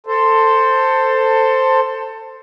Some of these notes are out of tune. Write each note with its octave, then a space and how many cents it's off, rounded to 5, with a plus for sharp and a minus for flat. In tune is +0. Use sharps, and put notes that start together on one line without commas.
A4 +20 C5 +0